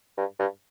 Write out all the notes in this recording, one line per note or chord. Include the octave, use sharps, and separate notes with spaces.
G2
G2